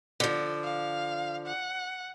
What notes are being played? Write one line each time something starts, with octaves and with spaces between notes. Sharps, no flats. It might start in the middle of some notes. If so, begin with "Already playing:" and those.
D3 F3
F5
F#5